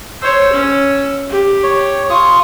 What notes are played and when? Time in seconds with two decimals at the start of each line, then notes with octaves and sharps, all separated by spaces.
0.22 C5 C#5 E6
0.52 C#4
1.29 G4
1.63 C#5
2.10 F4 C#6 D#6